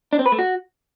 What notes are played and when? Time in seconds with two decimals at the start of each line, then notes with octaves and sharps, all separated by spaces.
0.13 D4
0.19 C4
0.26 B4
0.32 A3
0.39 F#4